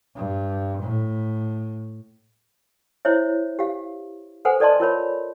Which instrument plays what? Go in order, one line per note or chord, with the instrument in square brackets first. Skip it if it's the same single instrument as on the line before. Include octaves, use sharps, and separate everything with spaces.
[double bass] G2
A2
[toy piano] E4 C5 C#5 E5
G4 F5
A4 B4 C5 F#5 G#5
A4 D5 D#5 A5 C6
F4 A#4 C#5 B5